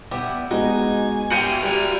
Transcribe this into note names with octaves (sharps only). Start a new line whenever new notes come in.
G3 B3 E4 D6
G#3 B3 D#4 F#4 G#5
G3 A3 F#4 G4 F5 G6 C#7 D#7
G3 E4 A#4 B4